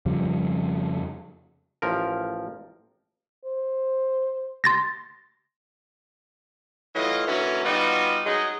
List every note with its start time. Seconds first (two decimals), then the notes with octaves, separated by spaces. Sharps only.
0.06 F2 C#3 F3 G3
1.82 A1 F3 A#4
3.45 C5
4.64 C6 A6 A#6
6.95 E3 F#3 A3 F4 D#5
7.27 D3 E3 F#3 A#3 C#4
7.64 G3 B3 D#4 F4 F#4
8.26 F#3 G#3 D#4 D#5